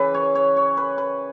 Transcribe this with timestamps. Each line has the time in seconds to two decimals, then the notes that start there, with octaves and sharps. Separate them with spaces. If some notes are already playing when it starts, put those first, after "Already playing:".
Already playing: C#3 E3 B4
0.14 C#5
0.35 C#5
0.57 C#5
0.77 B4
0.98 B4